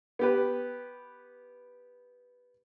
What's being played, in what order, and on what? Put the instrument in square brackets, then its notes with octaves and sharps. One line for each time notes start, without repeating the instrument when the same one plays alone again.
[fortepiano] B3 G4 B4